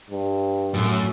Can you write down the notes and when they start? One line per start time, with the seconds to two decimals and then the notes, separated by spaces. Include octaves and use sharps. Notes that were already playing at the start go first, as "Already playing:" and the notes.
0.10 G2
0.74 F#2 A2 A3